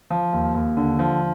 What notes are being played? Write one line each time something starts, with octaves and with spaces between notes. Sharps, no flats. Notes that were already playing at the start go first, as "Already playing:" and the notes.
F3
D#2
D#2
D3
F3